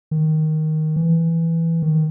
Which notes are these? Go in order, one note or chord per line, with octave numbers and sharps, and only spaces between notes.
D#3
E3
D#3